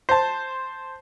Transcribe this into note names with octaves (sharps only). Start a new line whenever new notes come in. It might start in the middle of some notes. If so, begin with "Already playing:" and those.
C5 A5